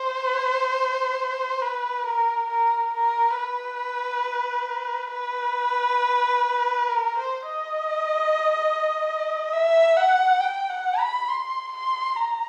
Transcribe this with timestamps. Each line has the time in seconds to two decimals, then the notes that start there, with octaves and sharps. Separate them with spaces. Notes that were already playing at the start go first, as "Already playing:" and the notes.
Already playing: C5
1.62 B4
2.06 A#4
2.50 A#4
2.94 A#4
3.38 B4
5.13 B4
6.89 A#4
7.18 C5
7.48 D#5
9.53 E5
9.97 F#5
10.40 G5
10.70 F#5
10.99 B5
11.29 C6
11.72 C6
12.16 A#5